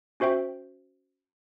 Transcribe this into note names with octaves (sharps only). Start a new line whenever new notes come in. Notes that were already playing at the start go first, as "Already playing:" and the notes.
C#4 F#4 C5 E5 G5